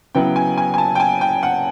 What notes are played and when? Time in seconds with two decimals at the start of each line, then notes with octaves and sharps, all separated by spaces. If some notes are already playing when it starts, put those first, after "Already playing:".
0.15 C#3 F#3 B3 E4 G5
0.36 G#5
0.57 G#5
0.74 G#5
0.78 A5
0.95 G5
1.00 G#5
1.21 G5
1.43 F#5